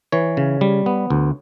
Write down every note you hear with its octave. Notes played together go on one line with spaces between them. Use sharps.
E3 C#5
C#3
G3
B3
D2